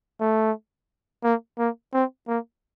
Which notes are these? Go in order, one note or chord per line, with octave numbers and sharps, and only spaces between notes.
A3
A#3
A#3
C4
A#3